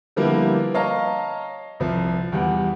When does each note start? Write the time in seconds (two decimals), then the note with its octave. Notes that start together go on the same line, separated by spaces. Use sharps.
0.16 D3 F3 G3 A#3 B3 E4
0.74 C#5 D#5 F5 A5 A#5
1.80 C2 F3
2.32 E2 G3 F#5